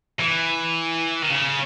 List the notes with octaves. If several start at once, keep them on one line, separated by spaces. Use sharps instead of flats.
E3
D#3
C#3